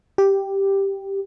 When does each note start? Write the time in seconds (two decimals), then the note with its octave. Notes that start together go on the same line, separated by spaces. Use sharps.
0.18 G4